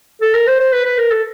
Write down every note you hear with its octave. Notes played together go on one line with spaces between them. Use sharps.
A4
A#4
C5
C5
B4
B4
A#4
A4